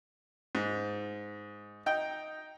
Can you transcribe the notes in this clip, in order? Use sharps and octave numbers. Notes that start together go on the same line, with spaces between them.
G#2
D#4 G5